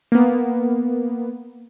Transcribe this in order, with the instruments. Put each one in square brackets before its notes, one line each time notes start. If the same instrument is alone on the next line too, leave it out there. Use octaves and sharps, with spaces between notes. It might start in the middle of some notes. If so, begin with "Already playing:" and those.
[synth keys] A#3 B3